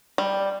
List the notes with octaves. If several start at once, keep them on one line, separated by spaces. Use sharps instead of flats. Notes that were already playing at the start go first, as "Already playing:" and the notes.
G3